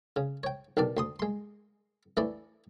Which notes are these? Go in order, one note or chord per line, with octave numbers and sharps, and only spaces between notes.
C#3
C#5 G5
B1 D#3 D4 D5
D2 C6 D#6
G#3 C6
E3 A3 D4 E4 D5